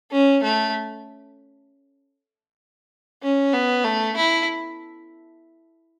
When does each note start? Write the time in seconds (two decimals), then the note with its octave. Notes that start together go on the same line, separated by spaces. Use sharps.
0.11 C#4
0.43 A3
3.23 C#4
3.53 B3
3.84 A3
4.16 E4